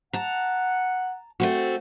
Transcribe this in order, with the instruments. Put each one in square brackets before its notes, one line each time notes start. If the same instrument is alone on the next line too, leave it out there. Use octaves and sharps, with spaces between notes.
[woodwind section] F#5 [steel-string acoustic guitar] A5 A#5
[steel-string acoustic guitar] A3 C4 F#4